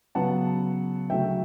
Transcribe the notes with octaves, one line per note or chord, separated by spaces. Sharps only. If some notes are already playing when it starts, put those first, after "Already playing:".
C#2 C#3 F#3 B3 F#5 A5
D2 C#3 F#3 A3 E5 G5